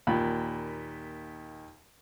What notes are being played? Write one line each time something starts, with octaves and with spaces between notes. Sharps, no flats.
D#2 A#2 B5